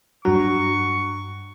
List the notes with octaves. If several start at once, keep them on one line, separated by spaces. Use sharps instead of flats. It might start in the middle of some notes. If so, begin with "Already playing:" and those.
G2 F#3 D4 C#6